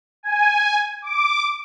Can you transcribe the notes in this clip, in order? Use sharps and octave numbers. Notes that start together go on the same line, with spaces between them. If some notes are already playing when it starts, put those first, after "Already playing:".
G#5
D6